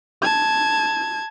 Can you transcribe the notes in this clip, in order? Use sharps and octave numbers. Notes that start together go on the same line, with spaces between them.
A5 G#6